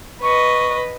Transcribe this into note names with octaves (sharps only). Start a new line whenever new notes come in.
B4 D#5 C#6